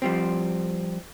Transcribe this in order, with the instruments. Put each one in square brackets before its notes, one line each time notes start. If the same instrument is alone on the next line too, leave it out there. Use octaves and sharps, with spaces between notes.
[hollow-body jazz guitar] F3 G3 C4